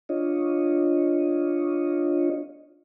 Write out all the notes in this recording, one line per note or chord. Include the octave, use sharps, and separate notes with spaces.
D4 F4 C#5 D#5